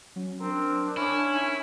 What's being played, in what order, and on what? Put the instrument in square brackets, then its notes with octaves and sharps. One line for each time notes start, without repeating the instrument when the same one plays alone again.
[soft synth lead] F#3 [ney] C#4
[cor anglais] C4 [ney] D4 [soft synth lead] A#4
[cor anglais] C#4 [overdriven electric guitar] E4
[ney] D#4 [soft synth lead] G#5